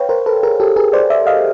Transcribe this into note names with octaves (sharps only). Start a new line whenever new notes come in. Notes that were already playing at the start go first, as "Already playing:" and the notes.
Already playing: B4 C#5 F5 G5
A#4 C5
A4 B4
G#4 A#4
G4 A4
G#4 A#4
C5 D5
D5 E5
D#5 F5